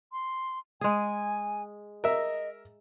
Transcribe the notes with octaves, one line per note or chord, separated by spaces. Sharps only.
C6
G#3 G#4 G#5
A#4 D#5 E5